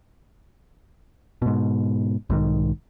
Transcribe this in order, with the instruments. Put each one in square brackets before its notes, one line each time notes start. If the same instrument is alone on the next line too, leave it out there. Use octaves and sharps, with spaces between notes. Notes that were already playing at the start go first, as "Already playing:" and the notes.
[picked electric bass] G#2 B2
B1 G#2 D#3